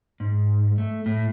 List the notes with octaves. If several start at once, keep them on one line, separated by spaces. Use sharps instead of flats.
G#2
A3
A2